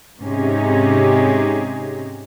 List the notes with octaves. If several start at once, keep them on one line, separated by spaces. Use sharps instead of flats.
G#2 C3 C#4 D#4 G4 G#4